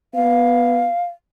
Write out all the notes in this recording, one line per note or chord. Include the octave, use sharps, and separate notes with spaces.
B3 F5